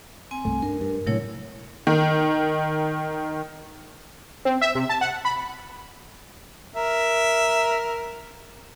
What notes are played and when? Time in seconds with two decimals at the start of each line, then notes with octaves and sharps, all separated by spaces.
0.31 C4 G#5
0.45 C2 G2 A3
0.62 D4 A#4
0.81 G2
1.07 A2 C3 F#3 A3 E4 C#5
1.87 D#3
4.45 C4
4.61 E5
4.75 C3
4.89 A5
5.01 F#5
5.25 B5
6.76 A#4 E5